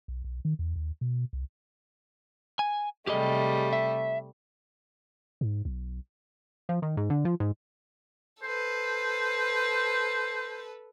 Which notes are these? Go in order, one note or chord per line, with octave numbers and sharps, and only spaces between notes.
B1
B1
D#3
E2
D#2
B2
C2
G#5
C3 G3 A3 G4 G#4 D#5
E5
G#2
B1
F3
D#3
G#2
D3
F3
G#2
A4 B4 C5